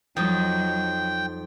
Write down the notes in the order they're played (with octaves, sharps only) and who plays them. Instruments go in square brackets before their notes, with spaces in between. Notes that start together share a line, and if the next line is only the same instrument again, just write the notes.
[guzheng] F2 D#4 [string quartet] F#3 [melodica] G5